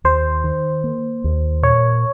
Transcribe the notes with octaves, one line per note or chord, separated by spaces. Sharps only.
D#2 C5
D#3
A#3
D#2
A#2 C#5